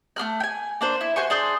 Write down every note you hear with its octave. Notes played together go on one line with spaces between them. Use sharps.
A3 A#3 F6 F#6
G5 G#5
A#3 D4 C5
E4
F#4 C5 G#5 C#6
D4 G#4 C6 G6